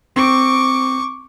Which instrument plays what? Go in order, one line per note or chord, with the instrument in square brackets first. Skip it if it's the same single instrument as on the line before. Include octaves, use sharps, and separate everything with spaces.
[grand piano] C4 [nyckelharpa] C#6 D6